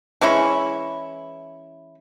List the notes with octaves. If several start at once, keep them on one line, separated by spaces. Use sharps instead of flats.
E3 G#3 C#4 E4